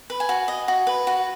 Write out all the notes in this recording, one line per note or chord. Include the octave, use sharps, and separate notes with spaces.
B4
G#5
F#4
D#5
F#4
B4
F#4